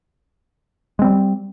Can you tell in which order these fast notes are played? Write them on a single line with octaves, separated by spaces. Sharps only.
G#3 C4 G3